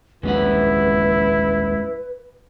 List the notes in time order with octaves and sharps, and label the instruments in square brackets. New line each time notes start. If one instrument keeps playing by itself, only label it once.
[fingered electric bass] D#1 A#1 F2 [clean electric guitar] G#3 C#4 F#5 [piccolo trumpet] E4 [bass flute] B4